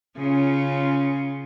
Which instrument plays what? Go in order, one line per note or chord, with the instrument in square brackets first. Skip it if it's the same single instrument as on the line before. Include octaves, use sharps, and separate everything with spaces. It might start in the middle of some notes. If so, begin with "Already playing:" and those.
[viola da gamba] C#3 C#4 F4